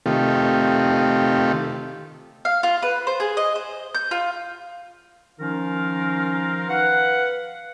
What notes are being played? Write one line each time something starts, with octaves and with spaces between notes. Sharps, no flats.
C3 D#3 A3 F4 G4
F5
F4
B4
C5
G#4
D#5
C5
G6
F4
D#3 F3 C#4 D#4 F4 A#4
B4 F5 F#5